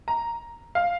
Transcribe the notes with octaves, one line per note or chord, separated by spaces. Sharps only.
A#5
F5